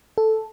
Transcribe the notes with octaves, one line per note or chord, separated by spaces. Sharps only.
A4